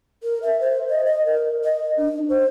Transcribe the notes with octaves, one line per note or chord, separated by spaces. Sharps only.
A#4
E5
C5
D#5
D#5
A#4
D#5
D4
C5